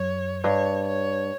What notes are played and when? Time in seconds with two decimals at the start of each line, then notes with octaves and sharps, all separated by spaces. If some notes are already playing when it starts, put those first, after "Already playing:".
Already playing: F#2 C#5
0.44 G2 C#5
0.88 C#5